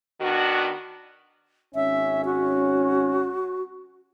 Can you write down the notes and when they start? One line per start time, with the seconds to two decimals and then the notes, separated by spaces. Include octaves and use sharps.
0.21 D#3 B3 D4 F#4
1.75 G#1 C#4 E5
2.25 F#4